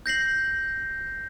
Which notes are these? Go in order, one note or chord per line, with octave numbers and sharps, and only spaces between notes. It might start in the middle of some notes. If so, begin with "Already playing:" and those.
G6 A#6 C7 F#7